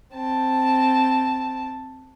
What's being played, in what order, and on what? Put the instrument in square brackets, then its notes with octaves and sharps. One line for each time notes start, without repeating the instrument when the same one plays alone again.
[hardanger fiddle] C4 A5